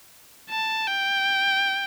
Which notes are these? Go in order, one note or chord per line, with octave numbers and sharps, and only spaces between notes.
A5
G5